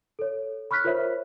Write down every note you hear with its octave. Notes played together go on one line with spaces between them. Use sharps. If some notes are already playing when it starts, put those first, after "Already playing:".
A4 C#5
B5 C#6 F6 F#6 B6
F4 A#4 C5 C#5 E5